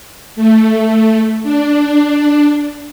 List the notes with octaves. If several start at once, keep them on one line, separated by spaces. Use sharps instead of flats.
A3
D4